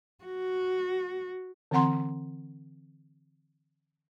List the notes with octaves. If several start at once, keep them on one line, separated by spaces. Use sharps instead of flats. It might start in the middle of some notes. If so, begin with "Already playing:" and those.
F#4
D3 E3 C4 F#5 A#5 C6